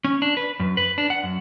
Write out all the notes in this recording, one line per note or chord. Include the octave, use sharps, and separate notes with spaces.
C#4
D4
B4
F#2
B4
D4
F#5
F#2